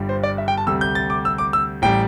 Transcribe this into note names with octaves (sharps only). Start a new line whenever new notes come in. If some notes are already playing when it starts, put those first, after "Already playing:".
Already playing: G1 G2 G3
C5
D5
E5
G5
A5
D2 C3 G3 E6
G6
A6
D6
E6
D6
E6
A1 G3 G5